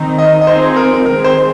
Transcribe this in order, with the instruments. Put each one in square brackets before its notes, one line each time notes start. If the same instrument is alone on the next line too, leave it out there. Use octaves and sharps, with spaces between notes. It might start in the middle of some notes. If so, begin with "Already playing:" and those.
Already playing: [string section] D#3 C4 D#4
[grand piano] D#5
D#5
[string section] F3 C4 D#4 G#4 [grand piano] C5
[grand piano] A#4
[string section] D#3 G#3 C4 [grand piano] A#4
[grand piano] C5